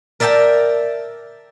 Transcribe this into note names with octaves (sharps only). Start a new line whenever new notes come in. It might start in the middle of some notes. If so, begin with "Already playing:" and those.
A#4 D5 E5 G5 A5 A#5